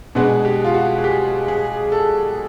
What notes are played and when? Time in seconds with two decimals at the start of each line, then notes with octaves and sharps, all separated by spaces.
0.15 B2 G#3 B3 D4 G#4
0.45 G4
0.64 F4
0.74 F#4
0.98 G#4
1.04 G4
1.48 G#4
1.92 A4